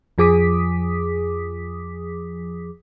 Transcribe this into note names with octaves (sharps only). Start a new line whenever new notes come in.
F2 F3 G#4 D6 D#6 B6